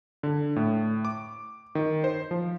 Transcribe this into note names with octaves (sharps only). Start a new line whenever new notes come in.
D3
A2
D6
D#3
C5
F3